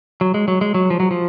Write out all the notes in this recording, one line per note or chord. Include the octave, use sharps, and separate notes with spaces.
F#3
G#3
F#3
G#3
F#3
F3
F#3
F3